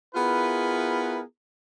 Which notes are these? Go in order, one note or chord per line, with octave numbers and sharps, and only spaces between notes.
B3 E4 F4 G#4 A#4 B4